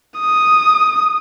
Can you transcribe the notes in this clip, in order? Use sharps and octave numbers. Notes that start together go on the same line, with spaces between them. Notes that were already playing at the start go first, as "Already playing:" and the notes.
D#6